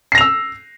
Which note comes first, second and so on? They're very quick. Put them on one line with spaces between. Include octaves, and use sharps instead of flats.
C7 A#6 F7 E6